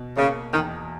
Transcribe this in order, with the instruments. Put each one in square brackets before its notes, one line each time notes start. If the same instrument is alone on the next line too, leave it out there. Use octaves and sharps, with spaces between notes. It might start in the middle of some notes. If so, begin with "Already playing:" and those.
Already playing: [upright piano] B2
[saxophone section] C#3 [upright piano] A#3
[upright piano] E2 [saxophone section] D#3